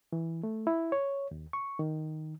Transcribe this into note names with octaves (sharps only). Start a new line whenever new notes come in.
E3
A3
E4
C#5
D#2
C#6
D#3